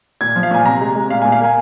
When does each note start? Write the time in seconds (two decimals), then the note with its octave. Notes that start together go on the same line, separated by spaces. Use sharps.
0.21 A#2 G#6
0.36 F3
0.43 F5
0.51 A#2 G#5
0.66 C3 A#5
0.81 G#3
0.95 G#3
1.10 A#2 F5
1.22 G#5
1.25 A#2
1.32 F5
1.40 A#3 G#5